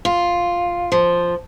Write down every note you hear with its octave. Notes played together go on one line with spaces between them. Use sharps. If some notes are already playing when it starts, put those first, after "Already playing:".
F4
F3